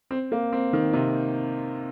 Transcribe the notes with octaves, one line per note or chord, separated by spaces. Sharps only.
C4
A#3
C4
D#3
C3